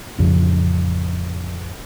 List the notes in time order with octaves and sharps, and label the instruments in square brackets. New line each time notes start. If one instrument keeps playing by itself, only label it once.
[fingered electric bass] A1 F2 C#3